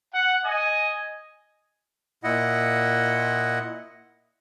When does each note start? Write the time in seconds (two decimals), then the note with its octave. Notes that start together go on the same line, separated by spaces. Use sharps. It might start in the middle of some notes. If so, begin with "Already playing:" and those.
0.13 F#5
0.44 D#5 G#5
2.24 A#2 E4 D#5 F#5